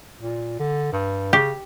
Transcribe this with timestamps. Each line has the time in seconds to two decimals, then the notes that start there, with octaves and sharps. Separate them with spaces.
0.21 A#2
0.59 D3
0.93 G2
1.33 C#3 G4